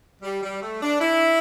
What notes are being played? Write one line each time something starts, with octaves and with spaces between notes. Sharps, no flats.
G3
G3
A3
D4
E4